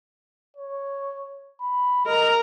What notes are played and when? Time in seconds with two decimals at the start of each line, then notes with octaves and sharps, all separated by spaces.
0.57 C#5
1.61 B5
2.06 A#4 D#5 A#5